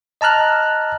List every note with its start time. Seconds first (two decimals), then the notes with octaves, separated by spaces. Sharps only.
0.21 D#5 A5 A#5 F6 F#6